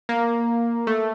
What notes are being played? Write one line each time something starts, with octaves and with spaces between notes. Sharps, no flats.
A#3
A3